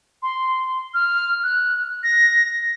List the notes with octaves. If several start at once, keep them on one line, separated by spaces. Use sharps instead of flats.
C6
F6
F#6
A#6